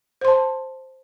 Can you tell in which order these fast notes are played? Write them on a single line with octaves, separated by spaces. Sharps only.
C5 C6 A5